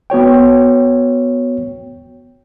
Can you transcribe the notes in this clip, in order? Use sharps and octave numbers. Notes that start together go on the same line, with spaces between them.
B3 F#4 C#5 G5